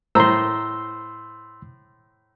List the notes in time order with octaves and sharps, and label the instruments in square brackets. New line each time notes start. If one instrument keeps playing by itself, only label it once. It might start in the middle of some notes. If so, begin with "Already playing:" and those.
[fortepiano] A2 C5 A#5 [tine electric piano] C6 E6